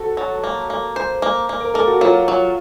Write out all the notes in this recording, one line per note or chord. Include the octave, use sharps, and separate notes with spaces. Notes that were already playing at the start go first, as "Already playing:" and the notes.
Already playing: F#4 A4
F#3
A#3
A#3
C5
A#3
A#3
A#4
A#3 A4
F#4
F#3 F4
F#3